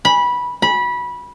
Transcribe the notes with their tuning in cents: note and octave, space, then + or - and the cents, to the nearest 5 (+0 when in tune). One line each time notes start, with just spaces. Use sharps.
B5 -15
B5 -20